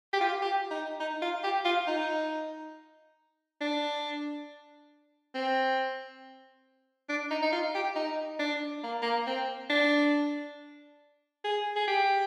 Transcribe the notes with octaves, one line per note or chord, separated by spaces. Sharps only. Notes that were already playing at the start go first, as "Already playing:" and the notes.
G4
F4
G4
G4
D#4
D#4
F4
G4
F4
D#4
D4
C4
D4
D#4
D#4
F4
G4
D#4
D4
A#3
A#3
C4
D4
G#4
G#4
G4